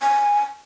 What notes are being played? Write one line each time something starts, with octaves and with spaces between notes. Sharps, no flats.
G#5